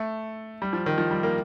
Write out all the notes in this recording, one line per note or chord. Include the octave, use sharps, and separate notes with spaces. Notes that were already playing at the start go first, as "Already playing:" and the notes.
Already playing: A3
G3
F3
D#3
F3
G3
A#3